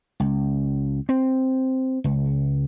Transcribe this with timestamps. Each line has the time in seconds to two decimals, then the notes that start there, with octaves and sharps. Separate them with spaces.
0.20 C#2
1.09 C4
2.04 C#2